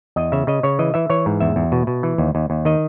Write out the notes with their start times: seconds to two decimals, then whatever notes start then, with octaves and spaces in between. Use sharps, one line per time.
0.16 E2 D#5
0.32 C#3 E5
0.47 C#3 D#5
0.63 C#3 C#5
0.79 E3 D#5
0.94 E3 E5
1.10 E3 C#5
1.26 G#2
1.41 E2 E5
1.56 E2
1.72 B2
1.87 B2
2.03 E3
2.18 D#2
2.35 D#2
2.50 D#2
2.65 D#3 D#5